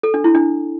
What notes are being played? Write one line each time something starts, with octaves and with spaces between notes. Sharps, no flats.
A4
D4
E4
D4